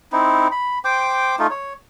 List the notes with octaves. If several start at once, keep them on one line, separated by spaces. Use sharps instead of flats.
C4 D#4 E4
B5
C5 G5 D6
A3 D#4 F4
C#5